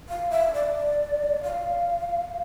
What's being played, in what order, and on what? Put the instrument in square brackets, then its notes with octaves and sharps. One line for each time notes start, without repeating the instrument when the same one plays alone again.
[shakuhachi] F5
E5
D5
F5